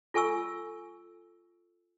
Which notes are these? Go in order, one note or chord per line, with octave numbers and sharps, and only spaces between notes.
F4 A4 G#5 C#6 E6